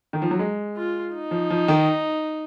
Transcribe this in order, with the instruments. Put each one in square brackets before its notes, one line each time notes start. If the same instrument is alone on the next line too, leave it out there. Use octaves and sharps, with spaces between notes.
[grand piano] D#3
F3
F#3
G#3
[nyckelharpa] F4
D#4
[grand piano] F3
F3
D#3